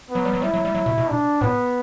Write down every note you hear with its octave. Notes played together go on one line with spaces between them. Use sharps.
B3
F#3
G3
F#3
G3 E4
F#3
G3
F#3
B2
B2
D4
A2 B3